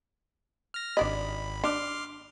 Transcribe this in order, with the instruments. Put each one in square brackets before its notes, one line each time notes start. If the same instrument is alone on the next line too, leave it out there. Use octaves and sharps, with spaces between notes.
[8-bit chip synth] F6 A#6
[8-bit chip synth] G#1 B5 [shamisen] D4 D5 D#5
[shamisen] D4 [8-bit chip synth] C6 D6 F6